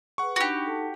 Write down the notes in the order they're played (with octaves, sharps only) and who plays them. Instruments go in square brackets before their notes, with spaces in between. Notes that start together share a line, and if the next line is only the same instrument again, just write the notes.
[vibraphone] G#4 B4 [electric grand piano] F#5 C#6
[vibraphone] D4 D#4 B5 [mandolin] F#4 G4
[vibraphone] D#4 A4 A5